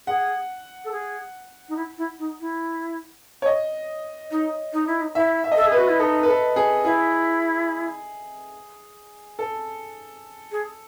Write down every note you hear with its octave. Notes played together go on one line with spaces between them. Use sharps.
G#4 F#5
A4
G#4
D#4
E4
E4
D#4
E4
C#5
D#5
D#4
D#4
E4
D#4
E4 E5
E5
D#5
A4 E5
G#4 B4
F#4
E4
D#4 A4
B4
A4
G#4
E4 G#4
A4
G#4